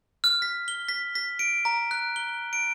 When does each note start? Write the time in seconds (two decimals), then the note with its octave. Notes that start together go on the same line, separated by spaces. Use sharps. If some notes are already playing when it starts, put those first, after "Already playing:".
0.24 F6
0.42 B6
0.68 G7
0.89 B6
1.15 B6
1.39 D7
1.65 A#5
1.91 F#6
2.16 G7
2.53 D7